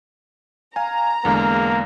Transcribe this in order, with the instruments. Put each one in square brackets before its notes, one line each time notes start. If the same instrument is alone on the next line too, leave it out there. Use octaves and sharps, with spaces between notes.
[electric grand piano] F5 G#5 [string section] A#5
[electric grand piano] E2 D3 G#3 [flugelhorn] A#3